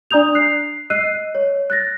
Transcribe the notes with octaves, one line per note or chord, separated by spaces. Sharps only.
D4 D5 A#5 D#6 G6 F7
F#6 C7
D#5 E6 F#6 C7 D#7
C#5
F#6 A6 A#6